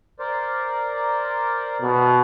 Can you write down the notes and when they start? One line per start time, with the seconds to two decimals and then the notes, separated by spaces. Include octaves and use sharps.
0.19 A#4 C5 D5
1.82 B2